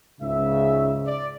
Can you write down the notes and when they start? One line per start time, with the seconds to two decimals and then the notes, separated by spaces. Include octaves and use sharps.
0.21 C#2 G#2 C#3 E5
1.07 D5